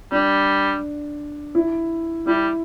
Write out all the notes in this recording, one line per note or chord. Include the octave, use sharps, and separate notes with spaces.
G3 D4
E4
G3 E4